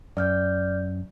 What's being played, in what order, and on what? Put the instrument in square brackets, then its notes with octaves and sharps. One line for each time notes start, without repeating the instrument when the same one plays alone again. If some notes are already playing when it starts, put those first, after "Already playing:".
[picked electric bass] F#2 [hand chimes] D5 F6 G6